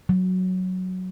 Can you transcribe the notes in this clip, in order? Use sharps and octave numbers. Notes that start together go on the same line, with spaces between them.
F#3